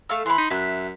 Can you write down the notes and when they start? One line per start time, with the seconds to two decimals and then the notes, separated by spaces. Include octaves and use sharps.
0.09 A3 F5 E6
0.26 E3 B5 C6
0.38 D#4
0.50 F#2 E5 F#6